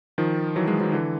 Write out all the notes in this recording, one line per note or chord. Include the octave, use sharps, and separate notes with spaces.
D#3 F3
E3 F#3
F#3 G#3
E3 F#3
D3 E3